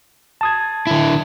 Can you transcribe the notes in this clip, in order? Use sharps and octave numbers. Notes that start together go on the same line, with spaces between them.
A5 D#6 G#6
D3 E4